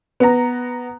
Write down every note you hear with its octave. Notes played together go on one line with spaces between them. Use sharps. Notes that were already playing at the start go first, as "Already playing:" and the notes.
B3 A#5